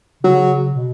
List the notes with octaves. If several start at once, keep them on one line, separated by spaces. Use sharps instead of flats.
C#3 F#3
B2